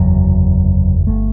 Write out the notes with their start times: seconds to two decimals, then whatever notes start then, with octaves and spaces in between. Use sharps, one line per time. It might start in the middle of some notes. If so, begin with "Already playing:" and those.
Already playing: F#1 E2 C3 F#3
1.07 G1 A3